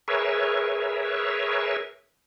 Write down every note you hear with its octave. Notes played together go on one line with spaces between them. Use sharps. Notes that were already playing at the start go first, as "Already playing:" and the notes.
G#4 A#4 B4 C#5 E5